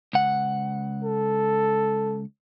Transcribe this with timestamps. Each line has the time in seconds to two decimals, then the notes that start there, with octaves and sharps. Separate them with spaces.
0.13 C#2 F#5
1.04 A4